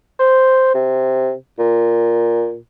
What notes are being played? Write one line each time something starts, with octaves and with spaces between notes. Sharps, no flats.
C5
C3
A#2